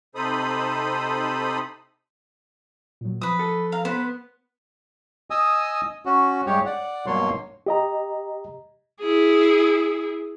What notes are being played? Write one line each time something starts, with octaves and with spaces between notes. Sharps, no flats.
C3 D#4 A4 C5 B5 D#6
A#2 F#3
F3 B4 D#6
A4
F5 A#5
B3 B4 C5
D#5 G#5 D#6 E6
C#4 F#4
G2 G#3 G4 C#5
D5 F#5
G2 B2 F#3 A#3 C#5 C6
G4 D#5 A#5
E4 G#4